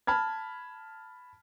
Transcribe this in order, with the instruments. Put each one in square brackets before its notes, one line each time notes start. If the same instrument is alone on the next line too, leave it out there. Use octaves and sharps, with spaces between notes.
[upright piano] A5 B5 F6 G#6